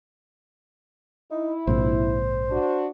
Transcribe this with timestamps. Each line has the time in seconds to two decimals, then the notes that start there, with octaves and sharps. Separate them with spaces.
1.31 D#4 E4
1.67 A#1 G#2 C3 C5
2.50 D4 F#4